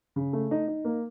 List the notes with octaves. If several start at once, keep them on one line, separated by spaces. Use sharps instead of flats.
C#3
A3
D#4
D#4
A#3